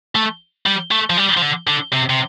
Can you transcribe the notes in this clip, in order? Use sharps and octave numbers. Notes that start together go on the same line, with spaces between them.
A3
G3
A3
F3
G3
F3
D3
D3
C3
C3